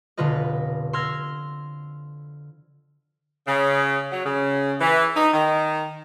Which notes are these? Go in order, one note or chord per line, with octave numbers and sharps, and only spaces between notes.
F1 B2 D3 F4 B4 D#5
C6 E6 F6 G#6 A#6
C#3
F#3
C#3
E3
D#4
D#3